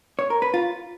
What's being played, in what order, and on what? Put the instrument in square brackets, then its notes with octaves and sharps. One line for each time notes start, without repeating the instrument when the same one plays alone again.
[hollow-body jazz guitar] C#5
A#4
B4
F4